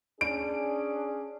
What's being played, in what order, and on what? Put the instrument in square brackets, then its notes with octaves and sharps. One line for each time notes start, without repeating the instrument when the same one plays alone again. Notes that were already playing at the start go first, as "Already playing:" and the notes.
[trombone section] C#4 G#4 [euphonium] D4 [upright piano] D7